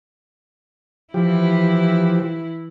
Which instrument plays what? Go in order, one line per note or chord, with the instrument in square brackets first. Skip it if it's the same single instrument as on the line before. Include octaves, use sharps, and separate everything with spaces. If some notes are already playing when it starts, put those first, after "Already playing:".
[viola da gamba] E3 E4 [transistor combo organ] F3 G4